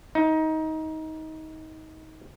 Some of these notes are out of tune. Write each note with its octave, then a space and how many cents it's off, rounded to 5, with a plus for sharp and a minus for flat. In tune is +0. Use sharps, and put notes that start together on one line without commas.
D#4 +20